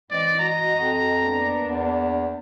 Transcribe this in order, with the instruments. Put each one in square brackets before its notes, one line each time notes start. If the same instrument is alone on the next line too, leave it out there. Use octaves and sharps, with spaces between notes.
[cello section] E3 C4 D#5 [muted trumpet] D5
[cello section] F#4 D#5 [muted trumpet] A#5
[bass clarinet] F2
[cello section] A#3 B3 D4
[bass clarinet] E2